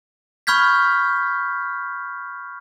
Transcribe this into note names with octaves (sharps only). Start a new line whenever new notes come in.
B5 C#6 F6 G6 G#6 B6